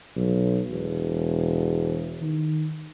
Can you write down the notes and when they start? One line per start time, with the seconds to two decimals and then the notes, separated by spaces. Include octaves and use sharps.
0.16 B1
0.70 E1
2.22 D#3